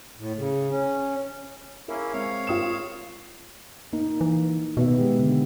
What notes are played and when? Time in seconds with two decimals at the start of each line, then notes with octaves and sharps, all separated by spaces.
0.18 A2
0.37 C#3
0.70 C#4
1.88 A#3 C#4 E4 G#4 A#4 E5
2.14 G#3 C4 C#5 F5
2.47 F4 D#6 E7
3.93 A#3 D#4
4.21 E3
4.77 B2 D#3 B3 E5
4.98 G#3 G4
5.19 D3